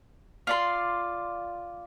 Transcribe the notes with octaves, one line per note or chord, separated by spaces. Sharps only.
F4 D5 C6